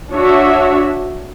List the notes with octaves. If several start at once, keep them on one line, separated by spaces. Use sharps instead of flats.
D4 F#4 C#5 E5